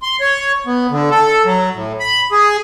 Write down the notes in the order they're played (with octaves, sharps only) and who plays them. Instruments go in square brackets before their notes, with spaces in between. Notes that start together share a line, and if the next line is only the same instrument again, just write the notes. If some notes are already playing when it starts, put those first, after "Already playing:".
[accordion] C6
C#5
B3
D3
A4
F#3
A2
B5
G#4